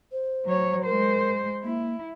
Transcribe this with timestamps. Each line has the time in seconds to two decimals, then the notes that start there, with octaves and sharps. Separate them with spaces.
0.12 C5
0.45 F#3 C#5
0.85 G#3 A#4 C5
1.63 A#3 E4